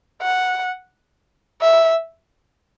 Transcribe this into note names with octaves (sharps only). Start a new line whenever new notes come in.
F#5
E5